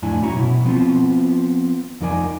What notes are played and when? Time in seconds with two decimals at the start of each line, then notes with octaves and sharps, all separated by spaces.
0.02 F2 A2 D4 E4 G#5
0.22 F#2 C#4 E4 F#4 A#5
0.35 B2 E4
0.65 F3 B3 C4 F4
2.01 F2 F3 D#4 A#4 D5 G#5